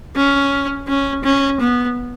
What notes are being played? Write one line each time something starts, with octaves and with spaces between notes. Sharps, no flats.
C#4
C#4
C#4
B3